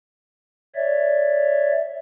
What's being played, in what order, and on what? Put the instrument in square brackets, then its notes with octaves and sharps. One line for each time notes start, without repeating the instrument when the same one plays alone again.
[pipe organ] C#5 D5 E5